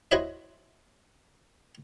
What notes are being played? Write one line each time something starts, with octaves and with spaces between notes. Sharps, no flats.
E4 F#4 C5 C#5 D#5 E5